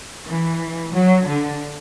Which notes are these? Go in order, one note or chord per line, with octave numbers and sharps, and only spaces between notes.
E3
F#3
D3